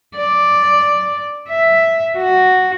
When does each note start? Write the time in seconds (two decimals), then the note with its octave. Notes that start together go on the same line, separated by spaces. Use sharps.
0.17 D5
1.50 E5
2.18 F#4